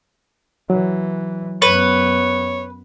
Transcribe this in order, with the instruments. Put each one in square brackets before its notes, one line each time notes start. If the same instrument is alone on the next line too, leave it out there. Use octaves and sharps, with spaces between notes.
[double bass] E3 [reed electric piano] F#3
[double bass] F#2 B3 [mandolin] B4 [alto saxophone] C#5